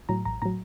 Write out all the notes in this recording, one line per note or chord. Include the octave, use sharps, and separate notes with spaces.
A2 F#3 A#5
A1 A#5
A2 F#3 A#5